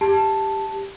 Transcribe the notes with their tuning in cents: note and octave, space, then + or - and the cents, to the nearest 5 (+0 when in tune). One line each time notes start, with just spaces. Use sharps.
G4 +5 A5 +0